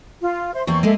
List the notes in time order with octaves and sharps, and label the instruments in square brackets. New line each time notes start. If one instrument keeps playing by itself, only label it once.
[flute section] F4
C5 E5 C6
[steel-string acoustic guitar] E2 A#3 C4 [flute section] C#6
[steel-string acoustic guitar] G#3 A#3 G#4 [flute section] A4 E5